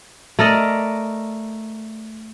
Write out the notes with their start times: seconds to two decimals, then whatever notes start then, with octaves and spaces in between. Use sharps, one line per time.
0.39 A3 A#4 D5 D#5